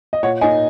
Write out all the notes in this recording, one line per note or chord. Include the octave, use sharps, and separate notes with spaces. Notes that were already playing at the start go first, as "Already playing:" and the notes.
D#5
A#2 C#5 F#5
A#3 D#4 D#5 G#5